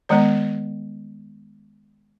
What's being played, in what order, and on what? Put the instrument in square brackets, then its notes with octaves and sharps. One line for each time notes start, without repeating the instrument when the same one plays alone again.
[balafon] D#3 G#3 B3 C#5